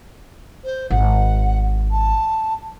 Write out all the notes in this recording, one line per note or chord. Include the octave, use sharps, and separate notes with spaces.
C5
G#1 F#5
A5